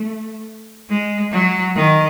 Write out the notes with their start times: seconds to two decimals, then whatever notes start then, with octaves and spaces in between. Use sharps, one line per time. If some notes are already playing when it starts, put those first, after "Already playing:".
Already playing: A3
0.89 G#3
1.32 F#3
1.76 D#3